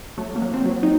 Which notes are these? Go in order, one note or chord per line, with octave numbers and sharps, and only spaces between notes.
F#3 A3
A#3
F#3
C4
F#3
D#4